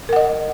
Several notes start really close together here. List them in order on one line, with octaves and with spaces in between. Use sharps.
A#4 F#5 D#5